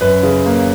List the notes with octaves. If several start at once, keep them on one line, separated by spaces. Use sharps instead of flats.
F#2 B4
C#3
A#3